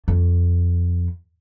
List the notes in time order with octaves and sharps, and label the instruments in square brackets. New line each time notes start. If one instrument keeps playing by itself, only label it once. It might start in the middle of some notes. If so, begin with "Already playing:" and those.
[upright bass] F2